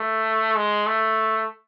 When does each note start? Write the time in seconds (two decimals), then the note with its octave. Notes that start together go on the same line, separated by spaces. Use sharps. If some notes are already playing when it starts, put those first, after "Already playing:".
Already playing: A3
0.56 G#3
0.87 A3